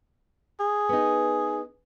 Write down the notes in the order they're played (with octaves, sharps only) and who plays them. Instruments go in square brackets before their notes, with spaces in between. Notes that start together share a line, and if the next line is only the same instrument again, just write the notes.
[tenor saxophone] G#4
[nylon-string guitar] B3 D#4